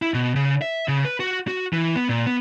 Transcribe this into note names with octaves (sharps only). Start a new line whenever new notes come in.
E4
B2
C#3
E5
C#3
B4
F#4
F#4
E3
B3
A#2
B3